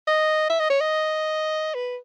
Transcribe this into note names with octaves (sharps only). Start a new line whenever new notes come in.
D#5
E5
D#5
C#5
D#5
B4